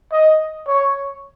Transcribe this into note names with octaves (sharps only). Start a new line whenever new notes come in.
D#5
C#5